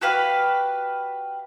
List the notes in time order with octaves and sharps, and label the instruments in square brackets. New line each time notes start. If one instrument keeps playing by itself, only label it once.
[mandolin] F#4 G4 B4 F5